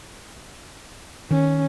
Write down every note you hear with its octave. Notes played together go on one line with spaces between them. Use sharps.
D#3 C#4